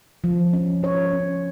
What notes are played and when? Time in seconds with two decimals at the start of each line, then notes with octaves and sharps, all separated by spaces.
0.24 F3
0.53 C#4
0.83 F3 C#5
1.13 C#4